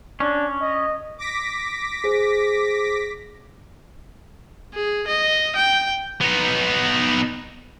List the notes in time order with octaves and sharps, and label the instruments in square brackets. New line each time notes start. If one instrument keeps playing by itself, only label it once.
[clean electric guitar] C#4 [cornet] D4
[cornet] D#5
[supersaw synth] D6 A#6 B6
[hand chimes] G#4 C5
[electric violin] G#4
D#5
G5
[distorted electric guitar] B3 D#4